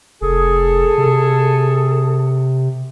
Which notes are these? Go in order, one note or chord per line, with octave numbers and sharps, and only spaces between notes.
F1 G#4 A4
C3